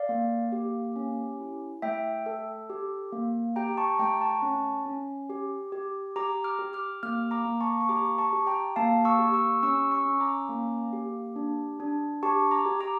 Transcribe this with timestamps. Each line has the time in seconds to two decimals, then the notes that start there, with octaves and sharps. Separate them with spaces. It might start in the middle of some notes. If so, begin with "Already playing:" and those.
Already playing: D5 F5
0.09 A#3
0.52 G4
0.96 C#4
1.40 E4
1.82 A3 E5 G5
2.26 A4
2.70 G4
3.13 A#3
3.56 G4 G5 A#5
3.77 A5 C#6
3.99 A3 G5 A#5
4.21 A5 C#6
4.42 C#4
4.86 C#4
5.30 G4
5.72 G4
6.16 G4 A#5 D6
6.44 D6 F6
6.59 G4
6.73 D6 F6
7.03 A#3 D6 F6
7.31 A#5 D6
7.46 A#3
7.61 A5 C#6
7.81 C#6
7.89 G4 A#5 D6
8.18 A5 C#6
8.33 G4
8.47 G5 A#5
8.76 A#3 F5 A5
9.05 C#6 E6
9.19 G4
9.34 C#6 E6
9.63 C#4 C#6 E6
9.91 C#6 E6
10.05 C#4
10.20 A#5 D6
10.49 A#3
10.93 G4
11.36 D4
11.80 D4
12.23 G4 A5 C#6
12.51 A#5 D6
12.66 G4
12.81 A#5 D6